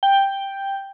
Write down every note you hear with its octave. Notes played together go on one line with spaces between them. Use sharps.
G5